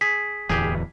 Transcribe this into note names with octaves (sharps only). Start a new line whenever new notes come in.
G#4 B6
D1 E2 E3 G4 G#4